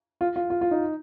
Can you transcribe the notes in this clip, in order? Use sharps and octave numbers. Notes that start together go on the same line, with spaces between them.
F4
F4
F4
F4
D#4